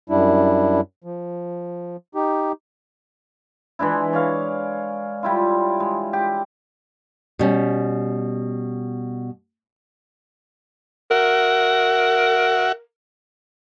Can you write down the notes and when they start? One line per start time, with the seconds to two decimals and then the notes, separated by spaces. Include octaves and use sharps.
0.10 F#2 G3 D4 E4
1.04 F3
2.15 D#4 G4
3.79 E3 G#3 D4 E4
4.13 C#5 D5 F5
5.23 G3 E4 F4
5.80 G#3
6.13 G4
7.39 B2 G3 C#4
11.11 F#4 A#4 E5 F#5